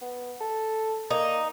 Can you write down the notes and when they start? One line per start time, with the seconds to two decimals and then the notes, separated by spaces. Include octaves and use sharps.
0.01 B3
0.41 A4
1.11 A#3 D#4